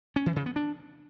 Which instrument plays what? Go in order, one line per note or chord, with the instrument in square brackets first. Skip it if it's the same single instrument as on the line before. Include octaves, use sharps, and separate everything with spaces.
[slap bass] C#4
E3
C#3
B3
D4